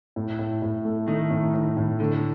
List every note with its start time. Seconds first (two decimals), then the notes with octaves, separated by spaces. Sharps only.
0.16 A2
0.39 A2
0.62 A2
0.85 A3
1.07 D#3 A3
1.31 A2
1.54 A2
1.77 A2
2.00 D3 A3